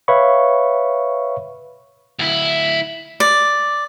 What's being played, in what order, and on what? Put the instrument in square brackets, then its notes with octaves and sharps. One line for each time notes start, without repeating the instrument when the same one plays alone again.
[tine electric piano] B4 C#5 E5 F5 B5 C#6
[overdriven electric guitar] D2 E4
[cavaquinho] D5